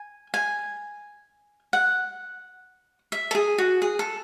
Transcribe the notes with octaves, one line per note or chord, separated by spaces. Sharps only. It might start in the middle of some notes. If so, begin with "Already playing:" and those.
Already playing: G#5
G#5
F#5
E5
A4
G#4
F#4
G#4
A4